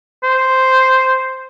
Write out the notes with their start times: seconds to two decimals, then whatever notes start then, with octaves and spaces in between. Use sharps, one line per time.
0.23 C5